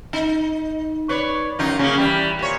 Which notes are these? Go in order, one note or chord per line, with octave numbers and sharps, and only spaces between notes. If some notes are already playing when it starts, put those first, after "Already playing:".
D#4
B4 C#5 D5
F#2 D#4 F4
C#3 A#3 C#4
E3 G3
A#2 C#5